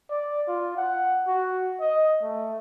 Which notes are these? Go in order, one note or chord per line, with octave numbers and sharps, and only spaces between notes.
D5
F4
F#5
F#4
D#5
A3